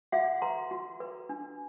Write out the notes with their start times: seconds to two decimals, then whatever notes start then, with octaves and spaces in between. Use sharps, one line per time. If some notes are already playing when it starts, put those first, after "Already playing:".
0.12 F#4 E5 F#5
0.42 B4 A#5 C6
0.71 F#4
1.00 B4
1.29 D4